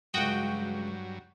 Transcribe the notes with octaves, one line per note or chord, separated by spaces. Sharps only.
C#2 G2 F#3 F#4 G5 D#6